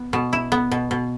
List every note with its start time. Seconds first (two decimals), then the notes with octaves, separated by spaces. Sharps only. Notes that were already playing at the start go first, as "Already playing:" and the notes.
Already playing: B3
0.13 B2
0.33 E4
0.52 B3
0.71 B2
0.91 B2